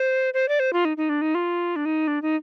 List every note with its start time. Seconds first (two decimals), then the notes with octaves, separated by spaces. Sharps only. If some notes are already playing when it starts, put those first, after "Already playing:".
Already playing: C5
0.34 C5
0.49 D5
0.60 C5
0.73 F4
0.85 D#4
0.97 D#4
1.09 D4
1.22 D#4
1.35 F4
1.76 D4
1.85 D#4
2.08 D4
2.22 D#4